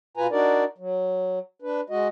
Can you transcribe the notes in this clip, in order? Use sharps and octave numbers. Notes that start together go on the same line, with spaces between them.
B2 F4 B4 G#5 A#5
D4 D#4 F#4 A#4 D5
F#3
D4 B4
G#3 F#4 D#5